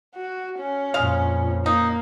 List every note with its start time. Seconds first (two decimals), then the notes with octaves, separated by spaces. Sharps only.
0.16 F#4
0.60 C#4
0.94 F2 A#2 G#3 F5
1.66 A#3 D#4